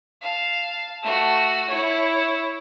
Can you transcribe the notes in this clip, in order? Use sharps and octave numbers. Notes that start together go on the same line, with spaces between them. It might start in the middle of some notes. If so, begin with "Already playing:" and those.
F5 A5
A3 F#4
E4 C#5